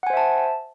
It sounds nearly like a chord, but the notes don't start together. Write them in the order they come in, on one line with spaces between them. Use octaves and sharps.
F#5 G#5 C5 E5 A5